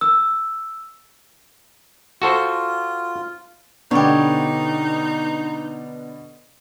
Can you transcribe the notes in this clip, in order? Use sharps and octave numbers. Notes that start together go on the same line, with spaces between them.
E6
F4 F#4 A4 C5
B2 D3 B3 D4 D#4 G4 C#5